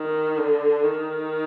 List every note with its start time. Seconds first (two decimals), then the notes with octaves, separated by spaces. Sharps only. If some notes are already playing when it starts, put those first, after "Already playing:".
Already playing: D#3
0.38 D3
0.83 D#3